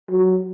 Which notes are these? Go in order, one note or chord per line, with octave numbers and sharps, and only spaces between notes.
F#3